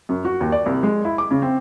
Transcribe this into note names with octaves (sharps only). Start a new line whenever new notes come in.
F#2
F#4
D#2
D5
C2
G#3
E4
D6
C#3
C4